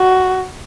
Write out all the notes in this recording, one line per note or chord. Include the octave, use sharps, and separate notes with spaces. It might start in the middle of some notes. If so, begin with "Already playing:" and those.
Already playing: F#4